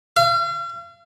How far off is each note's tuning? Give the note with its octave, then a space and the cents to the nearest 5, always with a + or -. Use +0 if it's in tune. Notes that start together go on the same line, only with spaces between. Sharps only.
F5 -40